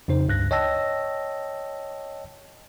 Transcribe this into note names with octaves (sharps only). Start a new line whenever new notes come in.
F2 C#3 D#4 C5
C#2 G2 F#6 A#6
C#5 D#5 G5 A5 E6 A#6